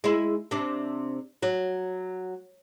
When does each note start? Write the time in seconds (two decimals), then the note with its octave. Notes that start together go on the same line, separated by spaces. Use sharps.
0.04 G#3 E4
0.51 C3 D4
1.42 F#3